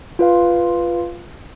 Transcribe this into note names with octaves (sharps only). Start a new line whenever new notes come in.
F4 B4 F5